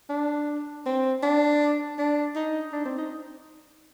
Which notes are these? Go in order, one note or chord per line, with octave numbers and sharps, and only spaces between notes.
D4
C4
D4
D4
D#4
D4
C4
D#4